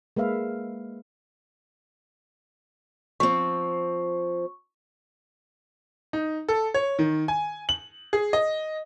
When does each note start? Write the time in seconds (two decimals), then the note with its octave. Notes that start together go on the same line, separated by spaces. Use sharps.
0.16 G#3 A#3 B4 E5 F5
3.20 F3 C4 C#6
6.13 D#4
6.48 A4
6.74 C#5
6.99 D#3
7.28 G#5
7.69 F#7
8.13 G#4
8.33 D#5